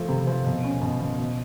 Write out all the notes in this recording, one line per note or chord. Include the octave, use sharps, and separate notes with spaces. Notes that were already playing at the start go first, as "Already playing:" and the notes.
Already playing: F3 A3
C3
F3
B2
C#4
B2
B2
B2